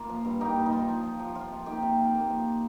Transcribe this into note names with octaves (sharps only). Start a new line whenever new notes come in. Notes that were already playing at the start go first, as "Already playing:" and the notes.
Already playing: A#3 F4
F3
G2
A#3 D#4 G4
G2
D#4
F3 F4
F3
F3
F3
F3 F4
C3
A#3 D#4 G4
C3
F3
A#3
F3